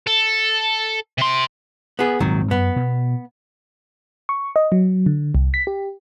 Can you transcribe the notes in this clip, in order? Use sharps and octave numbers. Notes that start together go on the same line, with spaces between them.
A4
C3 C6
B3 G#4
D#1 G#2 D#3 F#3 C4
F#2 B3
B2
C#6
D#5
F#3
D3
C2
B6
G4